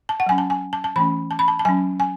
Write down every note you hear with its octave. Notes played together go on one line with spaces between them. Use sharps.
A5
F#5
F#3 C#4 G#5
A5
G#5
A5
A5
E3 A3 C#4 B5
A5
B5
A5
A5
F#3 C#4 G#5
G#5